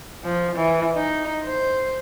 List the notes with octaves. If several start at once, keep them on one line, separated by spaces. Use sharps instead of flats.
F3
E3
D#4
C5